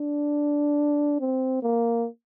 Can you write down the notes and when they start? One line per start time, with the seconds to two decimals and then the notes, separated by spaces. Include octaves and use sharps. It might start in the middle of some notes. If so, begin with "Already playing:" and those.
Already playing: D4
1.20 C4
1.63 A#3